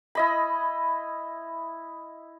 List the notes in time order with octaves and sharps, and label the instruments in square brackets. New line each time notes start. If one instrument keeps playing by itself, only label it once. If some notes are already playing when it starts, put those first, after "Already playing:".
[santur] E4 D#5 B5